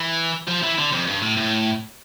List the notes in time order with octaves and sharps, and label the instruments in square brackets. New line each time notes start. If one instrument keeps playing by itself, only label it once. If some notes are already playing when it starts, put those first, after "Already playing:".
Already playing: [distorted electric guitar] E3
F3
E3
D3
F2
G2
A2
A2